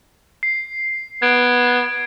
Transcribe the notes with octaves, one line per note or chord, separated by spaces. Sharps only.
C7
B3 G#6 D7